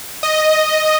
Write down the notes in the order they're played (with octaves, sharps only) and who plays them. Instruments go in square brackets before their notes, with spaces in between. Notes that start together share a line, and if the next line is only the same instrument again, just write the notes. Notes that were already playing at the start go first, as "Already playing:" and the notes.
[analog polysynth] D#5